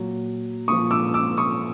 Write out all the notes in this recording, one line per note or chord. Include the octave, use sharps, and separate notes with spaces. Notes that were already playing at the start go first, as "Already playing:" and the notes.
Already playing: A#2 F#3
A#2 F3 C#6 D#6
D6 E6
D6 E6
C#6 D#6